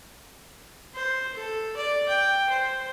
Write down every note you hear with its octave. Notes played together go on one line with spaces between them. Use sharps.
C5
A4
D5
G5
C5